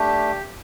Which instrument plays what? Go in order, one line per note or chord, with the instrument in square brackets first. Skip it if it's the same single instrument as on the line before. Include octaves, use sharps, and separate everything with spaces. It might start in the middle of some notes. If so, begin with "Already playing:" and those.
Already playing: [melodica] A3 D4 G4